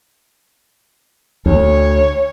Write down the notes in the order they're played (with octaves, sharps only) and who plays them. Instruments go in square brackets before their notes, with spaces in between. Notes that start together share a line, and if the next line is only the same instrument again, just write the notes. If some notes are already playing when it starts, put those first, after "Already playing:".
[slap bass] D2 [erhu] C#5